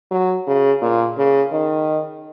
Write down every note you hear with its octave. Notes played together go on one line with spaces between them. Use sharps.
F#3
C#3
A#2
C#3
D#3